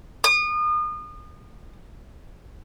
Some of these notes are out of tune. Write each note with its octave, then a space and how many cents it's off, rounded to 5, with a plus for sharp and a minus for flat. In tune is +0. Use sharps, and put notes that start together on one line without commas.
D#6 -35